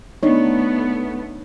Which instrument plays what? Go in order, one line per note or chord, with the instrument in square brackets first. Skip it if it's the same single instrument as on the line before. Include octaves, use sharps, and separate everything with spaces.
[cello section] A3 B3 [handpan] D4 D#4 C#5